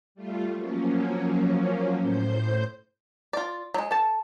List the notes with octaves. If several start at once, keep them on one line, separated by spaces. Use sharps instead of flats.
G3 A3 F4
F3 F#3 A#3 C#4
A2 C5 G6
F4 D5
F#3 G#3
A4 A5